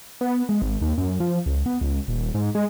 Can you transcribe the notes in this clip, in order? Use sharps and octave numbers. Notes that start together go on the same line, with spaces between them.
B3
G#3
G#1
D#2
F#2
F3
C#2
B3
C#2
D#1
G#2
G#3